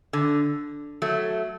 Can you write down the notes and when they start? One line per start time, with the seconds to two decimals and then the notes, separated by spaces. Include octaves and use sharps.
0.13 D3
1.02 F#3 A3